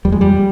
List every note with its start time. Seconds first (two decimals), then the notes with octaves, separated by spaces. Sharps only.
0.05 F2 G3
0.12 G#3
0.21 G3